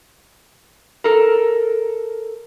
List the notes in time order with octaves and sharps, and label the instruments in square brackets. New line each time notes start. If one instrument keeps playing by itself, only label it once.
[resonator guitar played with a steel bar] A4 A#4